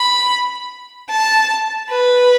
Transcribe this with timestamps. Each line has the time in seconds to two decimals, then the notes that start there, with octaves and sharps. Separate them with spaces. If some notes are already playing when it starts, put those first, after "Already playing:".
Already playing: B5
1.11 A5
1.90 B4